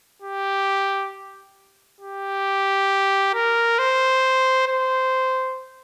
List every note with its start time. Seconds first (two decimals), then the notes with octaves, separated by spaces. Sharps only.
0.22 G4
2.00 G4
3.34 A#4
3.79 C5
4.68 C5